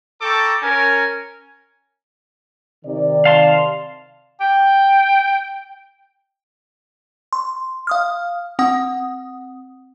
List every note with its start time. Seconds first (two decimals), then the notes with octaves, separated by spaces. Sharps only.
0.21 A4 G5 A5 A#5 C#6 D6
0.62 C#4 A#4 G#5
2.84 C3 D#3 D5
3.25 F5 A5 C6
4.41 G5
7.33 C6
7.87 F5 D#6 F6
8.59 C4 F#5 D#6